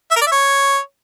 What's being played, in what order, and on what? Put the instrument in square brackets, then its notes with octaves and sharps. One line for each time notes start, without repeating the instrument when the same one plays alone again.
[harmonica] E5
A#4
D5
E5
C#5